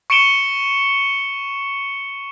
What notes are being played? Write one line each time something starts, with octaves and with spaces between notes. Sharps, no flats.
C#6 C#7 D7 E7 G7